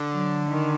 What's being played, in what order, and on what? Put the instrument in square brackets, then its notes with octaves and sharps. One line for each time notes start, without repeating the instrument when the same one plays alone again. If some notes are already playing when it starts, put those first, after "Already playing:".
Already playing: [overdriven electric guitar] D3
[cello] F#3
D#3